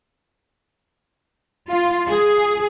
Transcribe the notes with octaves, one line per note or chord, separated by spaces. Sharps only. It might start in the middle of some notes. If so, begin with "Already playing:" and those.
F4
G#4